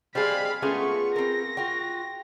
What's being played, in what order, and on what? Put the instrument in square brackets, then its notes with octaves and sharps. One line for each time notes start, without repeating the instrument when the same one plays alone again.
[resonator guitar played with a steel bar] G3 G#4 [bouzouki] G#3 C4 [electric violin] F5 B5
[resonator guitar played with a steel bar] G#3 A3 C#4 [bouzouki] B3 F4 G#4 [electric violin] C#6
[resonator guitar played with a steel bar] C4 A#4 [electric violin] A#6
[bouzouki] F4 F#4 [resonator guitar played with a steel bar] G5